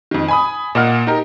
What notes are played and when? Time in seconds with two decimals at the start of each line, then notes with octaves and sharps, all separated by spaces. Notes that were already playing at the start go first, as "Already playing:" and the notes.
0.11 F2 D#3
0.28 G#5 B5 D#6
0.75 A#2 A#3 D#5 F#5 F6
1.07 D#4 G4 A#4